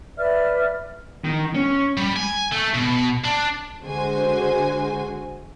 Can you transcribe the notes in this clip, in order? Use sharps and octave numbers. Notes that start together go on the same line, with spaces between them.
B4 D5 E5 F6
D#3
C#4
G3
G#5
A3
B2
D4
D3 G#3 F#4 C5 G#5